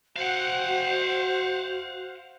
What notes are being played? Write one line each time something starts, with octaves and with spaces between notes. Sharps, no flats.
F#4 C5 F5 F#5